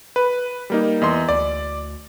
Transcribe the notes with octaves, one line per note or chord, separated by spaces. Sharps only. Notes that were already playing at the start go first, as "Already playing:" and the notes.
B4
G3 A#3 D#4
E2 D#5 C6
D2 D5